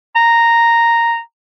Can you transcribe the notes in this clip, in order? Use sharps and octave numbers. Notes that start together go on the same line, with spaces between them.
A#5